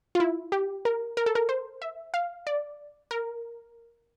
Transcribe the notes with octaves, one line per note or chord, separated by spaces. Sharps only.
F4
E4
G4
A#4
A#4
A4
A#4
C5
E5
F5
D5
A#4